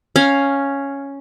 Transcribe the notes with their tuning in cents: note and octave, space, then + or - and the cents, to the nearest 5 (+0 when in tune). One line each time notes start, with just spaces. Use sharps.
C#4 +0 F5 +0